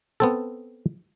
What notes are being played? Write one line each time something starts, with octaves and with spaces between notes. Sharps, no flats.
B3 C4 A4